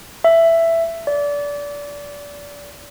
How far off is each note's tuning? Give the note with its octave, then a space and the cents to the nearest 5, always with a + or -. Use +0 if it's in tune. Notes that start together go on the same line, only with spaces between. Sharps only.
E5 +10
D5 -25